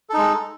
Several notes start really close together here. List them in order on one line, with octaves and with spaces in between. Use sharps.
A4 D#4 G#3